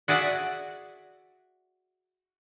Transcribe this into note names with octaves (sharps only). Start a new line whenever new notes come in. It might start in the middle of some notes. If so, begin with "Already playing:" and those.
F#4 G#4 D5 E5 F#5